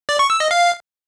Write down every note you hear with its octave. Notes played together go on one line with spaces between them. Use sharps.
D5
C#6
E6
D#5
F5